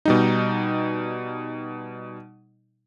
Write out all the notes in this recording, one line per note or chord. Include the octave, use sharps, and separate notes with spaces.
B2 G3 D#4